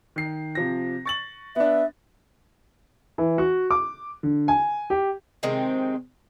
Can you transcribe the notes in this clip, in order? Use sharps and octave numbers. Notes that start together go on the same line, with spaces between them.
D#3 C7
C3 F3 A#6
C#6 A6 F#7
B3 D4 E5
E3
F#4
D6
D3
G#5
G4
C3 D#3 G#3 C4